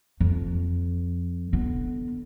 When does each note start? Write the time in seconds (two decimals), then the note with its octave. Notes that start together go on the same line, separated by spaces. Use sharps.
0.20 F2
1.53 D3 B3